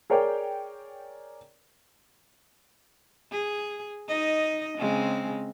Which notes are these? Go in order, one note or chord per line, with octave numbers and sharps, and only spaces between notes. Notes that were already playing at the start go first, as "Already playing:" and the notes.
G#4 A#4 C#5 D5 G5
G#4
D#4 D#5
C#3 G#3 C4